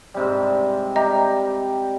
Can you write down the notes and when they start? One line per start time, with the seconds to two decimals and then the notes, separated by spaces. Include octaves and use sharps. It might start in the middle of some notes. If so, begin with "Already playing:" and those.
0.14 G#2 C3 G3
0.96 G4 D#5 E5 A#5